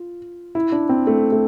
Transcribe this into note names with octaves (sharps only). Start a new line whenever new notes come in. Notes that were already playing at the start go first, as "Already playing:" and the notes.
Already playing: F4
E4
D4
C4
A3
A3